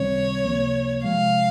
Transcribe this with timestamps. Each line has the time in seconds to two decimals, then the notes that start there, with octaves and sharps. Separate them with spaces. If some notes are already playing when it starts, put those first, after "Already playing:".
Already playing: C#2 C3 D#3 G3 C4 C#5
0.44 C#2 C3 F3 A#3
1.04 C3 F3 G#3 F5